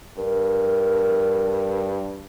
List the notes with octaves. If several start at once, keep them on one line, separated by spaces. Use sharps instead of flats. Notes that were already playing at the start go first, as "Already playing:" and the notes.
G2 A#4